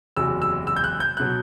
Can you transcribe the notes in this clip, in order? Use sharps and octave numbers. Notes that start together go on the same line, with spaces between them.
F#1 E2 C3 F#3 E6
E6
E6
G6
F#6
G6
B2 F#3 F#6